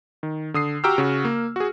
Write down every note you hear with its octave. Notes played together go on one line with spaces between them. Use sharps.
D#3
D3 D#6 C7
F#4 G4 G5 A#5 E6 F6
C#3 F#4
A#3
F#4 G#4